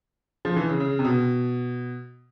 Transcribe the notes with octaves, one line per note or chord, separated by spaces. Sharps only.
F3
E3
C#3
C#3
C3
B2